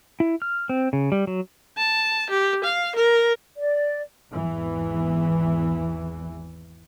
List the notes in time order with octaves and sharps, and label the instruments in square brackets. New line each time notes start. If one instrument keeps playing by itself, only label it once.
[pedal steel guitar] E4
F6
C4
C#3
G3
F#3
[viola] A5
G4
F5
A#4
[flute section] D5
[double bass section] G#1 E2 E3